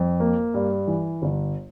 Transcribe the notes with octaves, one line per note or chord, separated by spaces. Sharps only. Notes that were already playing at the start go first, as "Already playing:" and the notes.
Already playing: F2
A#3
G2
E3
G1